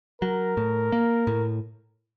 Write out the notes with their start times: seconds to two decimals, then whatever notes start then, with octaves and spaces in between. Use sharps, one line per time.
0.22 F#3 A#4
0.57 A2
0.92 A#3
1.27 A2